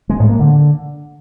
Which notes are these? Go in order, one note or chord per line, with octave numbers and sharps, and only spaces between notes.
G#3
A2
A#3
D3